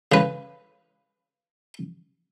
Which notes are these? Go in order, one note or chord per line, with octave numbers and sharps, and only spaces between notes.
C#3 B4